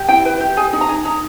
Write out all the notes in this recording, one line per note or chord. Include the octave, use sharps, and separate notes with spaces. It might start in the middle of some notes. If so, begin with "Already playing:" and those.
Already playing: G4
E4 G5
B4
G4
G#4 G#5
D#4
A#5
G#4
D#4 A#5